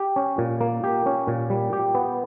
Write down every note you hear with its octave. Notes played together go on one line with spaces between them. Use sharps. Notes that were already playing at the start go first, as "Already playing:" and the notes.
Already playing: G4
C#4
A#2
A#3
G4
C#4
A#2
G3
G4
B3